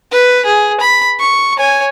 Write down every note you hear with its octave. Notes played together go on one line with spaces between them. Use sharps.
B4
G#4
B5
C#6
C#5 G#5